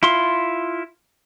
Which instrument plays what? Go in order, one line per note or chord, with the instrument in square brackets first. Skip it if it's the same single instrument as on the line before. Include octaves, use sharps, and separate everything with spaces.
[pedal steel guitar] E4 F4 C6